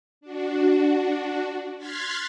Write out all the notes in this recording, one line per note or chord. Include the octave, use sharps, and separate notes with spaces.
D4 F#4
C6 F6 F#6 G#6 A6 B6